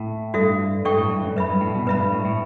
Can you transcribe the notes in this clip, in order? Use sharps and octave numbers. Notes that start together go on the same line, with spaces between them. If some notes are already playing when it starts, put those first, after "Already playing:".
Already playing: A2
G2 F#4 A4 E5
G2 A4 E5 G5 C#6
A2
G2
F#2
F#2 B4 E5 B5
G2
A2
B2
G2 B4 E5 B5
G2
A2
A2